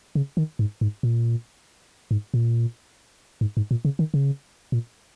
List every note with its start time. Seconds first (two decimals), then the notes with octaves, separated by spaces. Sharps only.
0.15 C#3
0.37 D#3
0.59 G#2
0.81 G#2
1.03 A#2
2.11 G#2
2.34 A#2
3.41 G#2
3.57 G#2
3.71 A#2
3.85 C#3
3.99 D#3
4.14 C#3
4.72 A#2